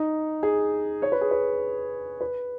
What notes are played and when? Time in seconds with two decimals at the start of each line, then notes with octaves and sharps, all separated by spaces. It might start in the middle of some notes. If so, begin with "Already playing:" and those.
Already playing: D#4
0.43 G#4
1.02 C#5
1.12 B4
1.21 G#4
1.31 B4
2.21 B4